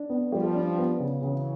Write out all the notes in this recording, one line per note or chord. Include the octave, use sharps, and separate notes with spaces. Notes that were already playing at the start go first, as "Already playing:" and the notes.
Already playing: D4
B3
F3 G3 G4
D4
B3
C#3
C#3 E3 F#3